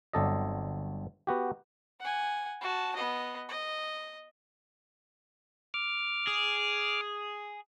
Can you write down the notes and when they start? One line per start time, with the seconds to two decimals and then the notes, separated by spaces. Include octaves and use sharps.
0.13 G1 F#3 C4 A4 D5 D#5
1.27 B3 F#4 G4
2.00 F#5 G#5
2.61 F#4 A5
2.96 B3 D#5
3.49 D#5
5.74 D6 F6
6.27 G#4